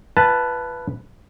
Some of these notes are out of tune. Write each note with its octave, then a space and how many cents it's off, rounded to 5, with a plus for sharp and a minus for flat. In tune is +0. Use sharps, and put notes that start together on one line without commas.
F4 -45 B4 +0 A5 +0